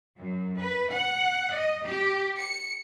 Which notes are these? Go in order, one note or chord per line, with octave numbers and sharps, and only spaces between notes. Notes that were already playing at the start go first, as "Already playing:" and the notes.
F#2
B4
F#5
D#5
G4
C#7